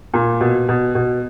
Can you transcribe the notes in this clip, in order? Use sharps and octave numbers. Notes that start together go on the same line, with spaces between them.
A#2
B2
B2
B2